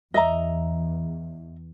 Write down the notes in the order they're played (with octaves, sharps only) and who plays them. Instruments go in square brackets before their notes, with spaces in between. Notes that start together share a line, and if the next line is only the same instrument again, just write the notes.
[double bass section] E2 [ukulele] D#5 E5 A#5